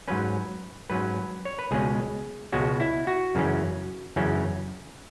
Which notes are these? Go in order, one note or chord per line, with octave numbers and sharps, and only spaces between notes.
G#2 F#3 C#4 B4
G#2 F#3 C#4 B4
C#5
B4
C#2 B2 G#3 C#4 G#4
C#2 B2 G#3 C#4 F#4
E4
F#4
F#2 C#3 E3 C#4
F#2 C#3 E3 C#4